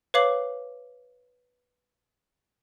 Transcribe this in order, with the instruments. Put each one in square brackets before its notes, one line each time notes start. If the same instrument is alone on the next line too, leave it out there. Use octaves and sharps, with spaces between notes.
[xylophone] B4 C#5 F5 D6 C7 F#7